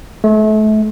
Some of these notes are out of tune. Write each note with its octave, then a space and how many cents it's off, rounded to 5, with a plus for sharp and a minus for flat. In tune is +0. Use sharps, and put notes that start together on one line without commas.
A3 -35